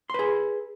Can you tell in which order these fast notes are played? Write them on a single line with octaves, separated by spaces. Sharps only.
C6 B4 G#4